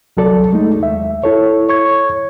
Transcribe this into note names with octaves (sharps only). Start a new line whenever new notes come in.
C2 F#3 A4 D5
G#3 A3 D#4
D#2 E5
E4 A4 C#5
C#5 C#6 G#6